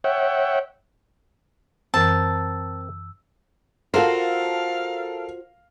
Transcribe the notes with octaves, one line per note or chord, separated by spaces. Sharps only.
C#5 E5 F#5 G5
F#2 E3 C4 A#4 A5 E6
F4 F#4 A4 A#4 C5 F5